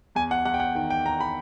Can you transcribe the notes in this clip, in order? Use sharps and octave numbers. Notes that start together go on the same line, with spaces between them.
E2 G#5
F#5
E2 F#5
G5
F#5
D#3 G5
G5
E2 A#5
B5